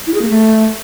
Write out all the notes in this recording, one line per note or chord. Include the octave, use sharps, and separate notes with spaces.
E4
G#4
A#3
A3